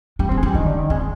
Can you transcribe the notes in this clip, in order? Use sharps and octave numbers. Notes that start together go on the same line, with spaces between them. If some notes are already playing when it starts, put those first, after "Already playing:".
G3 D4
B3 C4
G#3
D4
G3
D#3 D4
D3
D#3
G#3 C4